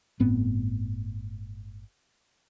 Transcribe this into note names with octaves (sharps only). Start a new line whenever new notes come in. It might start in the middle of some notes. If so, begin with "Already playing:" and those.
G1 A2 B3 C4